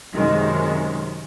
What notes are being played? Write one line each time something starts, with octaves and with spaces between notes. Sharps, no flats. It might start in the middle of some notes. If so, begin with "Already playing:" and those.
F#2 C3 D#3 G#3